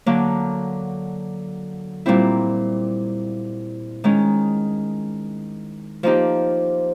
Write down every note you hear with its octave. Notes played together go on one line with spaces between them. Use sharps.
D3 F#3 A#3
A#2 G3 C4 E4
D#3 G#3 C#4
F3 A#3 D#4 G4